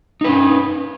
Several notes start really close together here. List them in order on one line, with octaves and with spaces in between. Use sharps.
D#4 B4 C#4